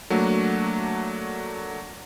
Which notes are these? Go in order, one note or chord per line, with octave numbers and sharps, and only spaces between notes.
F#3 A3 A#3 D4 F#4